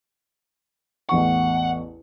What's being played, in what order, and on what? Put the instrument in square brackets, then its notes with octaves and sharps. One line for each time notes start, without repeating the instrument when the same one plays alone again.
[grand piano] A1 E2 C#6 [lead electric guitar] F#5